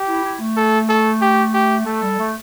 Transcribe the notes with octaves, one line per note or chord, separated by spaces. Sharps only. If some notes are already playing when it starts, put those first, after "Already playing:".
Already playing: G4
E4
E4
A3
A4
A4
G4
G4
A3 A4
G3
A3